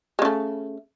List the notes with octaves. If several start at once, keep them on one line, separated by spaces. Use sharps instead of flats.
C#3 G#3 A3